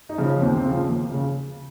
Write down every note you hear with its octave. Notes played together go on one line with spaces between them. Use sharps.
D#4
C#3 F3
C#4
D#2 C4
C4
C#3 F3
D#2
C#3